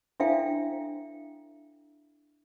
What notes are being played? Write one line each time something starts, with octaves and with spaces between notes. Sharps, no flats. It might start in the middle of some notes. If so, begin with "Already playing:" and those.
D4 E4 A4 E5 F5 G5